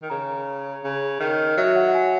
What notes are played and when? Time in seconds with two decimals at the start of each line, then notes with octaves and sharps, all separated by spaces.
0.02 D#3
0.10 C#3 A#5
0.84 C#3
1.20 D#3 D#5
1.57 F#3 E5
1.76 F#5
1.88 F#5
1.95 G#5